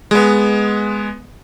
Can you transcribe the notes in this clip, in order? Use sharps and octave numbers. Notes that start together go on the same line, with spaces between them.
G#3 B3